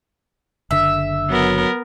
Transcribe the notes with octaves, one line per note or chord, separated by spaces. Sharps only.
F#1 D3 E5
F#3 B3 A#4